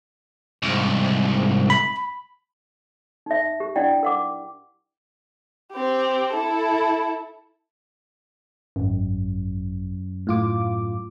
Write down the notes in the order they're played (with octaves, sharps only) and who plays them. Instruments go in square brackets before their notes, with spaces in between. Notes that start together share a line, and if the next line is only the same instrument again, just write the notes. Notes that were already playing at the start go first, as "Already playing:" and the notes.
[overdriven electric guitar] C2 G#2
[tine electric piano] B5
[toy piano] D#4 E5
G4
D4 E4 D5 F#5 G5
A#4 F#5 D6
[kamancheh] C4 G4
E4 A4
[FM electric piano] G#1 [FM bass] F#2
[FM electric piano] A2 F4 D6